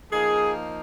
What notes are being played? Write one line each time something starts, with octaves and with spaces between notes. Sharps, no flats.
F3 A#3 D#4 G#4